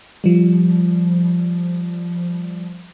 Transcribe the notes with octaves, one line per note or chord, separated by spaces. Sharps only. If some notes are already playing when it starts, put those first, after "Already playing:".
F3 G3